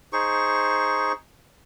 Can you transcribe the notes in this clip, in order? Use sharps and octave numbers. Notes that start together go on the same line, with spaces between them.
D#4 G#4 C5 C#6